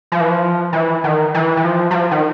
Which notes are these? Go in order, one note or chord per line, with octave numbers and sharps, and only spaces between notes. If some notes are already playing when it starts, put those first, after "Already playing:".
F3
E3
F3
E3
D#3
E3
E3
F3
F#3
F3
D#3